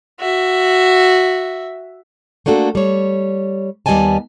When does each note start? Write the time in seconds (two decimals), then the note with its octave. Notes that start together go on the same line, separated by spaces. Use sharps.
0.20 F#4 E5
2.46 A3 A#3 D4 F#4 A4
2.75 G3 C#5
3.86 D#2 G3 B3 D#5 G#5 A5